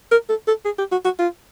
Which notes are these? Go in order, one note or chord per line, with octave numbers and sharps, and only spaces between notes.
A#4
A4
A4
G#4
G4
F#4
F#4
F4